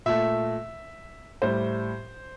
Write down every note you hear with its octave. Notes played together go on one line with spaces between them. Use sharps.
A#2 A3 E5
A2 G3 C5